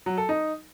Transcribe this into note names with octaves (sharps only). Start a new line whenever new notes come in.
F#3
A4
D#4